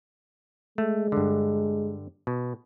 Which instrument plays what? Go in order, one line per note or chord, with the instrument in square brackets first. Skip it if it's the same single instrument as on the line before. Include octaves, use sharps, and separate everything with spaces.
[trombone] G#3 [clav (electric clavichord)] A3
[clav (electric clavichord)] G2 D3
B2